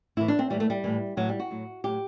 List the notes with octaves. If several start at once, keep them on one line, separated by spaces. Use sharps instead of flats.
A2 E3 E4
D4
C4
A2 E3 G3
A3
G3
A2 E3
A2 E3 F#3
G3
F#4
A2 F#3
A2 F#3 G4